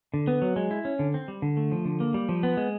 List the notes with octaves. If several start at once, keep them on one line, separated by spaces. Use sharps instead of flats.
D3
B3
F#3
G#3
E4
C#4
D3
C4
G3
D3
A3
F3
D3
A#3
G3
F3
B3
G#3